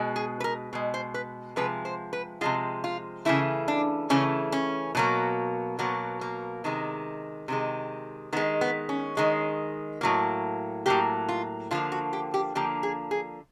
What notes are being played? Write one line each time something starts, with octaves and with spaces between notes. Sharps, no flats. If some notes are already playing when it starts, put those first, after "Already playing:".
Already playing: B2 G#3
G#4
B4
A#4
B2 G#3
C5
B4
C3 F3 G#3 B4
C5
B4
C3 F3 G#3 F4
F4
C#3 E3 A3 E4
D4
C#3 E3 A3 C#4
C#4
B2 F#3 A#3
B2 F#3 A#3 B3
A#3
C3 D#3 G#3
C3 D#3 G#3
D#3 G#3 B3
B3
C#4
D#3 G#3
A2 F#3 A#3
A2 F#3 A#3 G4
F4
D3 F3 A#3 F4
F#4
G4
G4
D3 F3 A#3 G4
G#4
G#4